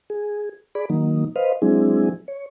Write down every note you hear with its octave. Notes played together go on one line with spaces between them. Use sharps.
G#4
G#4 D5 B5
D#3 F#3 A#3 D#4
B4 C5 D#5 F5
F#3 G#3 C4 D4 E4 G#4
C#5